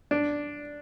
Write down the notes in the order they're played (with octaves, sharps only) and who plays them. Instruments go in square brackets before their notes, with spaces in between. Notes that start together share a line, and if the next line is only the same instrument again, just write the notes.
[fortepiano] D4